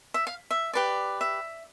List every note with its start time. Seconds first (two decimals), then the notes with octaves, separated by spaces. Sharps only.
0.14 E5
0.27 F5
0.51 E5
0.73 G4 B4 D5
1.21 E5